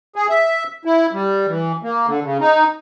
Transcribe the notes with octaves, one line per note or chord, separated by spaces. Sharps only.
G#4
E5
E4
G3
E3
A#3
D3
C#3
D#4